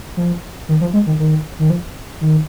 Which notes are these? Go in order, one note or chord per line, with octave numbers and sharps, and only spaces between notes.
F3
D#3
F3
G#3
D#3
D#3
D#3
F3
D#3